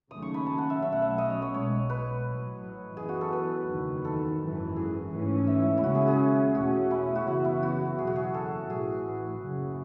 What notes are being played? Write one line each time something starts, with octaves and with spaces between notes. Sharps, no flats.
D#2 C#3 F#3 A3 C#4 D#6
C#6
B5
A5
F#5
E5
B1 B2 F#3 A3 C#4 E5
F#5
E5
D#5
C#5
C#5
B1 B2 G#3 C#5
B4
A1 A2 F#3
F#2 E3 B3 G#4
F#4
A4
B4
F#1 E2 D#3
A4
G#1 F#2 E3
G#4
G#2 E3 A3 C#4
E5
E4
D#2 C#3 G#3 C#4 F#4
G#4
G#4
E2 B2 A3 C#4 F#4
E4
F#4
F#1 F#2 C#3 E3 B3 E4
E4
F#4
F#1 E2 B2 F#3 G#4
F#4
G#4
A4
A1 A2 E3 G#4
F#1 F#2 C#3